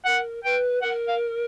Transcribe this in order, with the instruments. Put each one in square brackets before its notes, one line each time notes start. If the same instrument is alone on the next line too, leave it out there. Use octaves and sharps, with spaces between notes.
[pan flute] A#4 [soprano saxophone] F#5
[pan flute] B4 [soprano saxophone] G5
[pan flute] A#4 [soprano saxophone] F#5
[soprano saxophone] F5